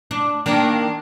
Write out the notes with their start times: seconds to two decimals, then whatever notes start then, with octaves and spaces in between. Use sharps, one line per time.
0.11 D4
0.46 D#3 A#3 D4 A#4